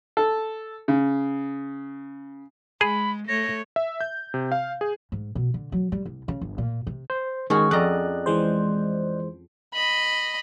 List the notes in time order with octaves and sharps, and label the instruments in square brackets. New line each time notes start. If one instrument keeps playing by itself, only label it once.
[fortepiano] A4
C#3
[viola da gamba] G#3 [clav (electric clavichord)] G#4 [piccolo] B5
[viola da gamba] A3 C#5 [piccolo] A#6
[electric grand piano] E5
G6
C3
F5
G#4
[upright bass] G#2
B2
D3
F#3
G3
C2
C#3
G1
A#2
C3
[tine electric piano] C5
[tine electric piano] D#3 G#3 [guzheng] C#4 F#4 G#4
[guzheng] F2 A#5 [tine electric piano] D5 D#5 F#6
[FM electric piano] E3 G#3 C5
[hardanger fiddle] D#5 B5